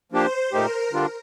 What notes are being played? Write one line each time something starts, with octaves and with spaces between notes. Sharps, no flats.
F3 A#3 D4 G4 C5
A#2 A3 D#4 G4 A#4
D3 G3 D4 F4